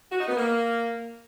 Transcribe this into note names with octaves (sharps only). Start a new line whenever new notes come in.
F#4
D#4
B3
A#3